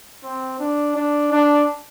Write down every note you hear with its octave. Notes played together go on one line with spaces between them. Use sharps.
C4
D4
D4
D4